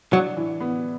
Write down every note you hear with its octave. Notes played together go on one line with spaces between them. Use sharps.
F#3 D4
E3
B3